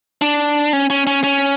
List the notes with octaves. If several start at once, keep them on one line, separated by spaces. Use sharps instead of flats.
D4
C#4
C#4
C#4
C#4